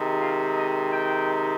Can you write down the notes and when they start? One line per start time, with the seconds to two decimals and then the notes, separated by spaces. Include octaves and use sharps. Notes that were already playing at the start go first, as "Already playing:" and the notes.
Already playing: C3 D#3 G#3
0.21 F4
0.57 D#5
0.93 G5